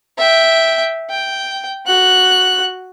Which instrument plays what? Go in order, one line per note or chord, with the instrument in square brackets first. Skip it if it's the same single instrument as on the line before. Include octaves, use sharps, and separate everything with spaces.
[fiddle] E5 G5
G5
F#4 F#6